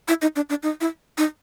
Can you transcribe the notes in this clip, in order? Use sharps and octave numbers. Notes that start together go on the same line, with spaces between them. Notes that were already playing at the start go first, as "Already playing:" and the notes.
E4
D#4
D4
D4
D#4
E4
D#4